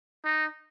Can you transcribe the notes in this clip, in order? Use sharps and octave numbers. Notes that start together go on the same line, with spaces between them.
D#4